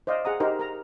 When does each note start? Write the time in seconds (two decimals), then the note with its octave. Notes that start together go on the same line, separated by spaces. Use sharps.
0.07 C5 D5 D#5 F5
0.25 G#4 F#5 A#5 D#6
0.40 D#4 G4 A#4 C5
0.60 A#4 A#5